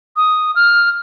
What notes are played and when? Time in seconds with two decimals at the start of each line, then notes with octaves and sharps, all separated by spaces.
0.17 D#6
0.55 F6